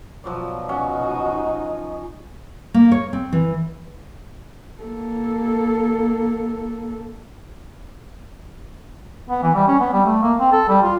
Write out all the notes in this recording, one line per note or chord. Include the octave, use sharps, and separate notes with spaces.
B2 F3 F#3 D5
C#4 D#4 F#4
A#3
C#5
C4
E3
A#3 A4
B3
E3
G3
C#4
B3
G3
A3
A#3
C4
A4
G3
F4